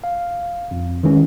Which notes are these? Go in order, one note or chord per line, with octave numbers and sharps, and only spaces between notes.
F5
F2
D#3 E3 G#3 C#4